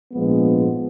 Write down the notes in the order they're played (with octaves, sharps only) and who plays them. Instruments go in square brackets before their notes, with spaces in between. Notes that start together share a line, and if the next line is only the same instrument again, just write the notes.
[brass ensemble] A#1 G#2 F3 G#3 B3